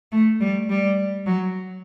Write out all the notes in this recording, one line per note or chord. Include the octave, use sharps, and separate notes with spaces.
A3
G3
G3
F#3